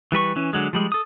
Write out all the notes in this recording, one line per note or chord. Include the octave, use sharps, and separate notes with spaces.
E3 G3 B4 C#6
E3 C#4
D3 F#3 G#3
F3 G3 G#3
A4 D#6